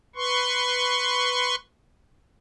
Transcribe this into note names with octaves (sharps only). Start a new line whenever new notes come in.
B4 C6 C#6